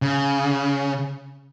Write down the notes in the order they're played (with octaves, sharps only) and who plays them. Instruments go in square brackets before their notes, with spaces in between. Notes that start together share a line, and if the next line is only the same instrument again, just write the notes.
[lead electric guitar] C#3